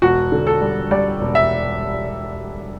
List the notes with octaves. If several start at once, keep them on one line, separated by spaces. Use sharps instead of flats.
E1 F#4
D3
A4
G3
G3 D5
E1
E5